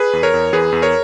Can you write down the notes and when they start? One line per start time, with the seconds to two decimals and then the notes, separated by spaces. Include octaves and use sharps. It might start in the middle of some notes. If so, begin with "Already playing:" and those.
Already playing: G#4 B4
0.13 E2
0.23 A#4 C#5
0.34 E2
0.53 E2 G#4 B4
0.72 E2
0.82 A#4 C#5